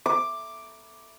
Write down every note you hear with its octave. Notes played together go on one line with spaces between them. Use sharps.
D6